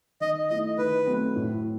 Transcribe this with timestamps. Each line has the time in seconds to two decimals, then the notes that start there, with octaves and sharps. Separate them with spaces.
0.20 D#3 D#5
0.50 A3 E4 D#5
0.78 D#3 B4
1.07 F#3 A3 C4
1.36 A2